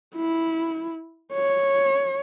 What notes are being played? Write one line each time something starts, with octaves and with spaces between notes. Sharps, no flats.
E4
C#5